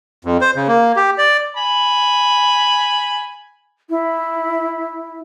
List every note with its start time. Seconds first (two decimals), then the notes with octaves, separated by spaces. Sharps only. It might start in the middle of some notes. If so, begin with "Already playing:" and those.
0.25 F2
0.41 C5
0.56 C#3
0.68 A#3
0.96 G4
1.18 D5
1.57 G#5 B5
3.90 E4